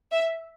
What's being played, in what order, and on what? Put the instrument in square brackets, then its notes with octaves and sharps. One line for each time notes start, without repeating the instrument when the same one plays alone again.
[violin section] E5